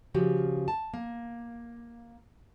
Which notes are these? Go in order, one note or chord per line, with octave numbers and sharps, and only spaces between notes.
C#3 F3 F#4 G4
A5
A#3